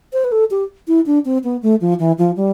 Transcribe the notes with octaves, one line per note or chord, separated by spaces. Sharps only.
C5
B4
A4
G4
E4
D4
C4
B3
A3
F3
E3
F3
G3